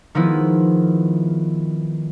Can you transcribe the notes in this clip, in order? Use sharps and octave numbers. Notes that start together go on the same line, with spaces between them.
D#3 F3 G#3 B3 E4